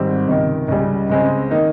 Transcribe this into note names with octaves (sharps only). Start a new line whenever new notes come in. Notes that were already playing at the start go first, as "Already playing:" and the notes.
Already playing: G#1 G#2 G3 C4
C#2 C3 D#3
C#2 C#3 G3
C#2 C#3 G#3 C4
D#3 A#3 D#4